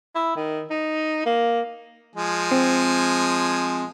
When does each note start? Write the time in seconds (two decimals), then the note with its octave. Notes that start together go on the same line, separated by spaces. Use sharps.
0.15 E4
0.36 D#3
0.70 D#4
1.26 A#3
2.15 F3 G#3 G#5
2.51 C4